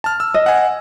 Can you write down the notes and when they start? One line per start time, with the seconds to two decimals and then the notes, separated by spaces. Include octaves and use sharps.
0.04 A5 F6
0.20 E6
0.34 D#5
0.46 F#5 G#5